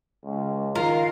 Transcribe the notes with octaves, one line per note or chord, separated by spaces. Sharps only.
C#2
D#3 F4 A#4 F5